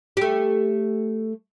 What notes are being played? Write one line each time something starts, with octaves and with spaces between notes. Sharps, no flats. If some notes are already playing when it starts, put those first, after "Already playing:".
A3 G4